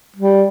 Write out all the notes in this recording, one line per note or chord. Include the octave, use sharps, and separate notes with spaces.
G3